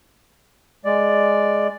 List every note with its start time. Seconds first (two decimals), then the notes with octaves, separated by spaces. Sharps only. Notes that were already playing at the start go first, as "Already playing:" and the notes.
0.85 G#3 D5